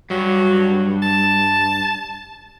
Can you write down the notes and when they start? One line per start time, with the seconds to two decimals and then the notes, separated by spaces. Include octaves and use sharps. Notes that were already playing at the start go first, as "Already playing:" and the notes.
0.10 G2 F#3
1.02 A5